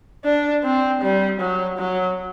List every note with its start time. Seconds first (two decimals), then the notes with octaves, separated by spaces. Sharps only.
0.24 D4
0.63 C4
1.02 G3
1.40 F#3
1.78 F#3